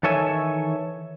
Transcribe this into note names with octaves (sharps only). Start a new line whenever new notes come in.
D#3 E3 A4 C#5 E5 G#5